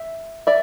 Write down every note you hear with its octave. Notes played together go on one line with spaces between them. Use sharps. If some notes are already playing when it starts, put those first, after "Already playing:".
Already playing: E5
D5 E5